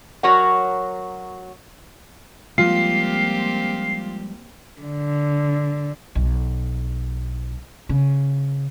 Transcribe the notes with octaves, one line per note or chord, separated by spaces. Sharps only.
F#3 F#4 A#4 C#5 F#5
F3 G3 G#3 A#3 C4 F4 G4 C7
D3
B1
C#3